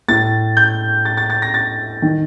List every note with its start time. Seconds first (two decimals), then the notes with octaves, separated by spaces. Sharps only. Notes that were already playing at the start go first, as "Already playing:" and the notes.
0.08 A2 A6
0.57 G6
1.05 A6
1.17 A6
1.30 A6
1.42 A#6
1.54 A6
2.02 D#3